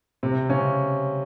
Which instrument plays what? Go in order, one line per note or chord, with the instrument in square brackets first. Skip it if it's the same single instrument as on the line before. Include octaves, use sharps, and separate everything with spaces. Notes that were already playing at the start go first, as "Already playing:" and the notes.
[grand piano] C3 C4
C#3 C#4